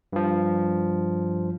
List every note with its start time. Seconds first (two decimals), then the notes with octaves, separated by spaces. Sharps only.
0.13 G2 F3